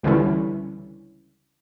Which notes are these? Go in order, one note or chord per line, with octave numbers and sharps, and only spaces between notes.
C#2 D3 E3 G3 C#4 E4